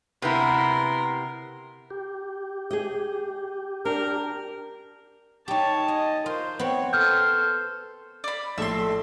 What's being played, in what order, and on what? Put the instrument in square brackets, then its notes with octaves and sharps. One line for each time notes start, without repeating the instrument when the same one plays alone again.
[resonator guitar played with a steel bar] C3 B3 E4 [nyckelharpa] A#4 C6
[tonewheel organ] G4
[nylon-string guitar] G#4 D#5
[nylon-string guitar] D4 [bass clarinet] A#4
[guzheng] D#4 G4 [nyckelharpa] C#5 A5
[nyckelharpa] D#5 [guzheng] G#5
[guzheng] F4 [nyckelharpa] A#4 C5
[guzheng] B3 C4 [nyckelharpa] C#5
[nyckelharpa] A4 C5 [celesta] F6 G6
[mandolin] D5 B5
[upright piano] A#1 A2 [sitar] A4 E5 [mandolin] C6 E6